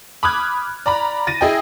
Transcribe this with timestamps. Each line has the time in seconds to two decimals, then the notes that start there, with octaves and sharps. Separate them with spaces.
0.23 B5 D6 D#6 F6 F#6 G#6
0.86 D5 A#5 B5
1.27 A6 A#6 D#7
1.41 E4 G#4 D#5 G5